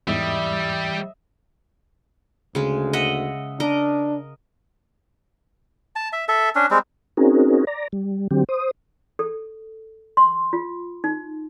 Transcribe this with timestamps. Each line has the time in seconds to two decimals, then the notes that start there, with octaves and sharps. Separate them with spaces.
0.08 E2 G#2 E3 G3 D#5 E5
2.55 D2 C#3 G#3
2.93 D#5 E5 F#5
3.60 D4 A#4 D#5
5.96 A5
6.13 E5
6.28 A4 E5
6.55 C#4 D4
6.71 G3 G#3 C4
7.17 C4 C#4 D#4 F#4 G#4 A#4
7.67 D5 A#5
7.93 G3
8.31 D3 F#3 C4 G4
8.49 C5 D#6
9.19 A4
10.17 C6
10.53 F4
11.04 D#4